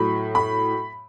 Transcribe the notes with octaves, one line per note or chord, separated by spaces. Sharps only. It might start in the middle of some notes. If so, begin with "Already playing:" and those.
Already playing: A2 F#3 B5
B5